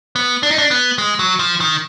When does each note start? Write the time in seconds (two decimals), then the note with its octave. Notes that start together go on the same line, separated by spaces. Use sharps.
0.16 B3
0.43 D4
0.51 D#4
0.58 D4
0.71 B3
0.98 G#3
1.19 F#3
1.39 F3
1.60 D#3